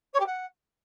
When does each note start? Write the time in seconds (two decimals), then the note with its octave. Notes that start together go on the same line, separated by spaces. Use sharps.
0.13 C#5
0.20 G4
0.26 F#5